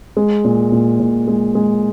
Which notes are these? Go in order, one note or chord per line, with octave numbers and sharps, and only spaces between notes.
G#3
A#2
A#2
A#2
G#3
G#3